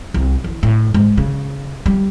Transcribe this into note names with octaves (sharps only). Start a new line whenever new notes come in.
C2
E3
A2
G#2
C#3
G3